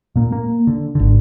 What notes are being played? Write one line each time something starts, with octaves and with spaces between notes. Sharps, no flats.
A#2 A#3
A#3
D3
G#1 D3